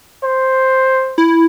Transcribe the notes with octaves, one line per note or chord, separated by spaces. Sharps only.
C5
E4